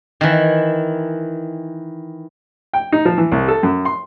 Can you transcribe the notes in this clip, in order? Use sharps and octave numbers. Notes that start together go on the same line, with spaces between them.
D#3 E3
G5
D#4
F3
E3
C2
A4
F#2
C6